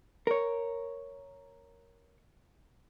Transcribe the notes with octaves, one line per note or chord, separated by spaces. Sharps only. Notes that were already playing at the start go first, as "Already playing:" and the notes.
A#4 C#5